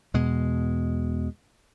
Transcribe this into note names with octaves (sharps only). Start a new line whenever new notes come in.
E2 B2 G#3